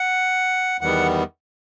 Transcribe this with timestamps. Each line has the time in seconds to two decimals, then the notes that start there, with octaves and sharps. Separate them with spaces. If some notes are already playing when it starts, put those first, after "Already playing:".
Already playing: F#5
0.81 E2 D#3 G3 B3 F#5